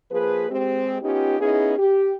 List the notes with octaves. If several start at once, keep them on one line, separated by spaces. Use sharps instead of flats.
F3 A#3 G#4 B4
G#3 C4 G4
B3 C#4 D#4 F4 G4
B3 C#4 D#4 E4 G#4
G4